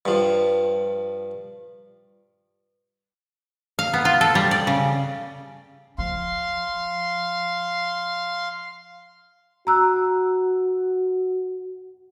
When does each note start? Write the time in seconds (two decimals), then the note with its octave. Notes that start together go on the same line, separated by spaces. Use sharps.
0.05 G2 F3
3.79 F5
3.93 B3
4.05 F4
4.21 A4
4.35 G3
4.51 D5
4.67 C#3
5.98 F3 F5 C6
9.67 F#4 A#5 E6 F#6